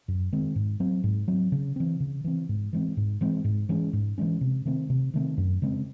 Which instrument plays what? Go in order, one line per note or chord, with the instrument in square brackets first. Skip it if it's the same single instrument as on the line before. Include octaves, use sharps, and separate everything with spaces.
[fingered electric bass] F#2
D#3 G#3 C4
G#2
F#3 C4
G#2
F#3 C4
C#3
E3 C4
C#3
E3 C4
G#2
E3 G#3 C4
G#2
E3 G#3 C4
G#2
E3 G#3 C#4
G#2
E3 G#3 C#4
C3
D#3 A3 C4
C3
D#3 A3 C4
F#2
C#3 G#3 C4